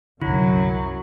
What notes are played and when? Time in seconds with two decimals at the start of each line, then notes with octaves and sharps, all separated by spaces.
0.22 C2 F#2 D3 F#3 E4 F#4